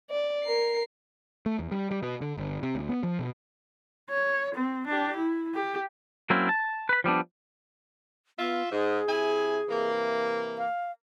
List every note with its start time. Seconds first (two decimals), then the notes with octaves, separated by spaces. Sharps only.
0.11 D5
0.44 A#4 C7
1.46 A3
1.59 E2
1.71 G3
1.91 G3
2.03 B2
2.21 D3
2.38 G1
2.63 C3
2.75 D2
2.89 B3
3.03 F3
3.19 B2
4.10 C#5
4.55 C4
4.87 D4 G4
5.16 E4
5.54 G4
6.30 F#3 A#3 C4 C#4 E4
6.49 A5
6.89 B4 B5
7.04 F3 G3 B3 D4
8.39 B3 F4 E5
8.72 G#2 G#4
9.07 C3 E4 G#5
9.69 C3 E3 A#3
10.58 F5